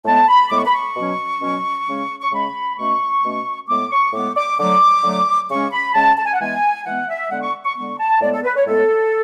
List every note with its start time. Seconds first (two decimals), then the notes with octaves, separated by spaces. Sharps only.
0.05 A2 G#3 B3 A5
0.28 B5
0.50 A2 G#3 B3 D6
0.57 C#6
0.66 B5
0.73 C#6
0.96 B2 F#3 C#4
1.41 B2 F#3 C#4
1.86 C#3 G#3 C#4
2.21 C#6
2.32 C#3 G#3 C#4 B5
2.78 B2 A3 C#4 C#6
3.23 B2 A3 C#4
3.68 A2 G#3 B3 D6
3.90 C#6
4.13 A2 G#3 B3 D6
4.36 D6
4.59 D3 F#3 A3 D6
5.04 D3 F#3 A3
5.49 C#3 G#3 C#4 C#6
5.72 B5
5.94 C#3 G#3 C#4 A5
6.18 A5
6.25 G#5
6.33 F#5
6.40 E3 G#3 B3 G#5
6.85 E3 G#3 B3 F#5
7.09 E5
7.30 D3 G#3 B3 F#5
7.42 C#6
7.65 C#6
7.76 D3 G#3 B3 C#6
8.00 A5
8.21 A2 G#3 B3 D5
8.33 A4
8.45 B4
8.56 C#5
8.67 A2 G#3 B3 A4